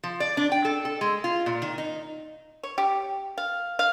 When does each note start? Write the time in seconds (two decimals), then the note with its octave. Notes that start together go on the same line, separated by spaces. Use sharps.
0.03 F3
0.20 D5
0.37 D4
0.52 G5
0.65 A4
0.85 A4
1.01 G#3
1.24 F4
1.46 A#2
1.62 D#3
1.78 D#4
2.63 C#5
2.78 G4
3.38 F5
3.79 F5